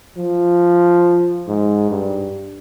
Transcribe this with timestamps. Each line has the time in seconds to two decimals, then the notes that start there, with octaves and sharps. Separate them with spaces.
0.18 F3
1.48 G#2
1.91 G2